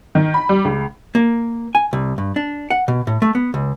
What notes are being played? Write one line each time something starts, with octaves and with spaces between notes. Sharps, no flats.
D#3
B5
G3
C#2
A#3
G#5
C2
G2
D4
F#5
B2
A2
A3
B3
C#2